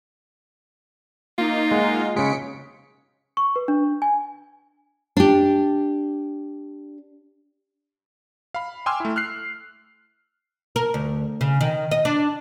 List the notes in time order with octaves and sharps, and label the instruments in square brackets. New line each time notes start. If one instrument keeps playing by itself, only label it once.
[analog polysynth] A#3 D#4 [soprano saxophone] F4
[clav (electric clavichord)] G#3 F#5
[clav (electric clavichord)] C#3 G#3 [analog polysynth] B6 C#7 D7
[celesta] C#6
B4
D4
G#5
[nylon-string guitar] D4 G4
[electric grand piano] F5 B5
G5 G#5 C6 D6 E6 F6
A3 E4
F6 F#6 C7
[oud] A#4
D2
C#3
D#3
D#5
D4